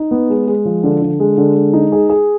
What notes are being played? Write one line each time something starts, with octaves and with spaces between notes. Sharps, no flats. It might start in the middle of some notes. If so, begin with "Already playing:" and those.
Already playing: D#4
B3
G#3
G#3
F3
D3
D3
G#3
D3
G#3
D#4
G#4
G#4